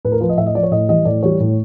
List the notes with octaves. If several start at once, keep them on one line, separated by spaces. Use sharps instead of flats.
A2 B4
A#4
F3 B4
D#5
A2 E5
D#5
F3 D5
C#5
A2 D#5
E3 G3 D#5
A2 D5
E3 G3 C#5
A2